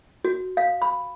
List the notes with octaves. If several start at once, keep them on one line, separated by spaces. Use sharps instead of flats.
F#4
F5
B5